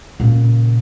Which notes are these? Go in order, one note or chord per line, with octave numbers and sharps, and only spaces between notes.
A#2 C#3